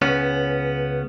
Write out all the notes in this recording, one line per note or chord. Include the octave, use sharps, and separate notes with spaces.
C#2 B3 C#4